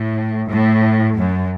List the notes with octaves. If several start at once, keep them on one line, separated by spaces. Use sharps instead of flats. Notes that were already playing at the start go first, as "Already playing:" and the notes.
Already playing: A2
A2
F#2